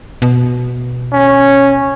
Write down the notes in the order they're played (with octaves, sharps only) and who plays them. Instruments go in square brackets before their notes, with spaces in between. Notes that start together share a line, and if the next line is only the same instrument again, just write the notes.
[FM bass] B2
[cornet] C#4